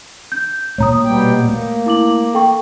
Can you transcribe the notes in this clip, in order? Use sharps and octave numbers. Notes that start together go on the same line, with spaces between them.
G6
A#2 A3 C#5 A#5 D#6
B2 G3 G5
A3 A#3
E4 D6 F#7
A4 G5 C#6